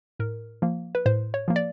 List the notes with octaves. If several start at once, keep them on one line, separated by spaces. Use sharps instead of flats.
A2 A#4
F3 A#3
B4
A2 C5
C#5
F3 A#3
D5